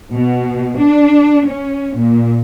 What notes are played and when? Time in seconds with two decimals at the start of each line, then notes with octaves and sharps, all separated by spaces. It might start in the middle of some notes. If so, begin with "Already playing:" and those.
0.12 B2
0.80 D4
1.47 C#4
1.96 A#2